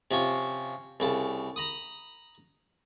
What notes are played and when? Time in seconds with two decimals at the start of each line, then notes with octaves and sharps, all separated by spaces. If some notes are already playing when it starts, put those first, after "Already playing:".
0.11 C3 F3 C#4
1.00 C2 C#3 A5
1.56 A#5 B5 D#6